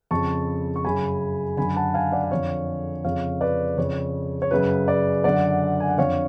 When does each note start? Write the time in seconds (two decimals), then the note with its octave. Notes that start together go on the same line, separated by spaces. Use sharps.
0.11 F2 C#3 A5 C#6
0.76 C#6
0.84 F#2 C#3 G#5 B5
1.57 F#2 D3 G#5 B5
1.76 F#5 A5
1.94 F5 G#5
2.12 D5 F#5
2.23 F#5
2.31 F2 D3 C#5 F5
3.04 F2 C#3 C#5 F5
3.41 B4 D5
3.78 F2 C#3 C#5
4.42 C#5
4.51 F#2 C#3 B4
4.88 B4 D5
5.24 F#2 D3 D5 F#5
5.80 G#5
5.89 F#5
5.98 F2 D3 C#5 F5